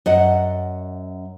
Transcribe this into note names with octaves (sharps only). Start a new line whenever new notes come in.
F#2 D#5 F#5